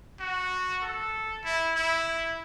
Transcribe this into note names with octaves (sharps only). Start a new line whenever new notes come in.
F#4
A4
E4
E4